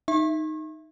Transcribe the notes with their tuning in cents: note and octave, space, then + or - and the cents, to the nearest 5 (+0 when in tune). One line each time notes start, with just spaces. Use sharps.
D#4 +0 E5 +5 C#6 -40